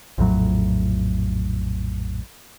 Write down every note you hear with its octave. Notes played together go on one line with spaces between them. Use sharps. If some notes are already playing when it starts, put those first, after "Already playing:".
A#1 F2 A2 F#3